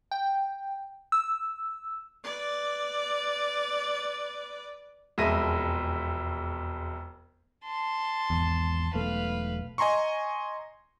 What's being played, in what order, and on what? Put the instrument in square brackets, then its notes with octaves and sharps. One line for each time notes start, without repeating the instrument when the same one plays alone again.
[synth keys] G5
E6
[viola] B4 D5
[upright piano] E1 F2 G#3 E5 A#6 D#7
[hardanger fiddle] A5 C6
[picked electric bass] G#1 E2
[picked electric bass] E1 B1 A3 [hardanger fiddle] B4 F5
[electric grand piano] D#5 G#5 A#5 C6 C#6